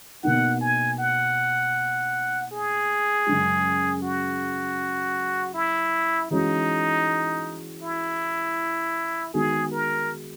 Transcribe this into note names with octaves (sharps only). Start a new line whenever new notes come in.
B2 A#3 D#4 F#5
G#5
F#5
G#4
F#2 C#3 G#3
F#4
E4
E3 G#3 C#4 D#4 F#4
E4
D#3 G#3 B3 F#4 G#4
A#4